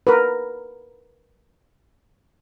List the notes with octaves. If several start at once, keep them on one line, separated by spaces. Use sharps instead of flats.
A#4 B4